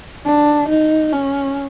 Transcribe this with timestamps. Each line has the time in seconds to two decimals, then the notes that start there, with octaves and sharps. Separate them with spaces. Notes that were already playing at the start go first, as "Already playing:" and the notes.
0.25 D4
0.68 D#4
1.12 C#4